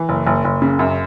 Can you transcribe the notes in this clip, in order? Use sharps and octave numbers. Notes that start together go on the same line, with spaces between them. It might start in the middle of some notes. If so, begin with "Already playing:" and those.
Already playing: E3
F#1
F#1
F#1
C#3
F#2